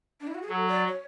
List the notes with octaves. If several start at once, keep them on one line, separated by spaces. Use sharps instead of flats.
D4
E4
F#4
G#4
F#3 A4
D5
C#5